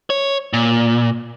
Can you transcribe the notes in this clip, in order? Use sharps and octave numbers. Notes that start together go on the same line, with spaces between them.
C#5
A#2